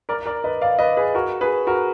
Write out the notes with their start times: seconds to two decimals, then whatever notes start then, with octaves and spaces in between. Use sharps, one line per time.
0.09 A#4 D5
0.26 A#4 D5
0.44 B4 D#5
0.62 D5 F5
0.79 B4 D#5
0.97 G#4 B4
1.14 F#4 A#4
1.41 G#4 B4
1.67 F#4 A#4